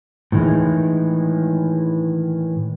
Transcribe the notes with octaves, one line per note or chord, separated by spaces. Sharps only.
A2 D#3 E3 G#3